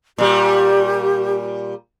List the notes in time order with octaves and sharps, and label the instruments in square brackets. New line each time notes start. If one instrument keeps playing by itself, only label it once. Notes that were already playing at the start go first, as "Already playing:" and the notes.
[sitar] A#2 G3 [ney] G4